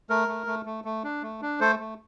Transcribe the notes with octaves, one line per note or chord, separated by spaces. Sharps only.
A3 A#4
A3
A3
A3
A3
D4
A3
D4
A3 A4 C5
A3